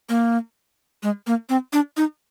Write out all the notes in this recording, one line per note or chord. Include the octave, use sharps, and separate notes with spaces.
A#3
G#3
A#3
C4
D4
D#4